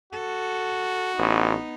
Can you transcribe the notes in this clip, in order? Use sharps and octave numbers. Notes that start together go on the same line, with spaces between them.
F#4 A4
A1 B3 D#4